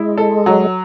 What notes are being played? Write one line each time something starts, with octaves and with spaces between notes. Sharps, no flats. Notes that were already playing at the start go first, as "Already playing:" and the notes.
Already playing: G#3 E4
A4
F#3